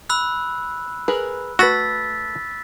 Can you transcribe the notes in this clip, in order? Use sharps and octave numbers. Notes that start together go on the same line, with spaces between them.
B5 E6 F#6
G#4 A#4 B4
A3 F#4 B4 E6 A6 B6